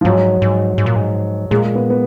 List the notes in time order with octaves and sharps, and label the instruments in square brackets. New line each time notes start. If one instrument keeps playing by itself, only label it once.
[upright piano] F3
[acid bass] G#2 [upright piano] F#3
[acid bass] G#2
G#2
A#2
G#2
[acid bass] A#2 [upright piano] G#3
[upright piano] B3
B3